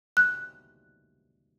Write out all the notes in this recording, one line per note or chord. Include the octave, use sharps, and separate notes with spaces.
F#6